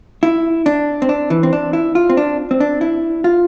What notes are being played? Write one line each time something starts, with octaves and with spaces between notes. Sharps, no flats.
E4
D4
C4
D4
E3
C4
D4
E4
F4
C4
D4
C4
D4
E4
F4